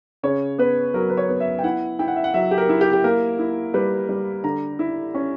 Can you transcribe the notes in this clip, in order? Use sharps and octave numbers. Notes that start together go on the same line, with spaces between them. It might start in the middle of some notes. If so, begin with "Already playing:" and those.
C#3 C#5
B3 B4
F#3 A#4
B4
C#5
B3
E5
G5
E4 F#5
E4 G5
F#5
E5
F#5
F#3 E5
G4
A#4
E4
G4
G4
A#3 A#4
E4
G3 B4
G3
D3 A#5
E4
C#4